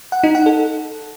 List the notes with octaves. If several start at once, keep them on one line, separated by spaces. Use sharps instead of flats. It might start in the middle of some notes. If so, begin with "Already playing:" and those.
F#5
D#4
F#5
A4